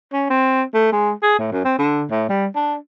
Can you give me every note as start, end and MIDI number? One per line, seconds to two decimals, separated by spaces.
0.13 0.30 61
0.30 0.63 60
0.74 0.92 57
0.92 1.11 56
1.23 1.36 68
1.39 1.52 45
1.52 1.64 42
1.65 1.77 60
1.79 2.04 50
2.10 2.27 45
2.29 2.47 55
2.56 2.75 62